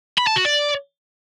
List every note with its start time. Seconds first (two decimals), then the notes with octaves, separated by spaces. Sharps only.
0.18 B5
0.27 A5
0.36 F#4
0.45 D5